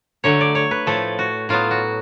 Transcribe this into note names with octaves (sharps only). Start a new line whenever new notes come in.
D3 F#3 A3 C#5
D5
C#5
B4
A2 F3 A3 A4
F#4
A2 F#3 B3 F4
F#4